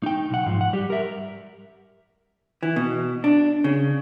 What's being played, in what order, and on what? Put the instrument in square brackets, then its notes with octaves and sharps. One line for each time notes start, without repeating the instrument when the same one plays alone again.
[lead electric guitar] D#4 G5
B1 F#5
G#2 F3
F#5
G3 G4
A#4 E5
[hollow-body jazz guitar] E3
B2
D4
C#3